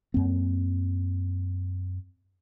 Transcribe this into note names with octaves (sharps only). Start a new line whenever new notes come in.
F#2 A#3 C4